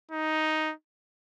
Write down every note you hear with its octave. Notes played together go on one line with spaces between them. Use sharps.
D#4